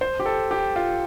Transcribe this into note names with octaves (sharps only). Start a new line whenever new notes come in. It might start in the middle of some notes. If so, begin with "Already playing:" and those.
C5
G4
A4
G4
F4